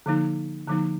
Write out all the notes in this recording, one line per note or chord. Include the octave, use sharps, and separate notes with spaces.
D3 F3 A#3 D#4
D3 F3 A#3 D#4